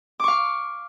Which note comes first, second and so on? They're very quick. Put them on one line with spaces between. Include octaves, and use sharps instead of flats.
D6 C#6 F5